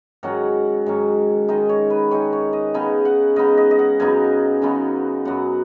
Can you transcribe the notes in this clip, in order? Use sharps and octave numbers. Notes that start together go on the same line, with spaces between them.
G#2 D#3 F#3 C#4 F#5
G#2 D#3 F#3 C#4
D#3 G#3 D#4 D#5
C#5
B4
D#3 G#3 D#4 C#5
C#5
D#5
C#3 B3 D#4 G#5
F#5
C#3 B3 D#4 D#5
D#5
D#5
F#5
F#2 C#3 B3 D#4 G#5
F#2 C#3 B3 D#4
F#2 F#3 B3 F#5